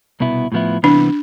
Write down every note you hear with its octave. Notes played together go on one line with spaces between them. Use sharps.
C2 B2 B3 E4
A2 F3 B3 E4
C2 C3 E3 B3 D4